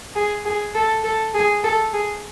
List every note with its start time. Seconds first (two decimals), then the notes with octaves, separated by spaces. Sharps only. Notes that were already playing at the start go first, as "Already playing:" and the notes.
0.16 G#4
0.45 G#4
0.75 A4
1.04 A4
1.34 G#4
1.64 A4
1.93 G#4